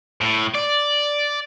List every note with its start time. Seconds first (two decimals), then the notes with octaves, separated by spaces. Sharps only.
0.21 A2
0.54 D5